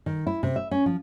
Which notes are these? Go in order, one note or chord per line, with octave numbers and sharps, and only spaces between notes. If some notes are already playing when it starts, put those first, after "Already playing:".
D#3
E4
C3
E5
C#4
F3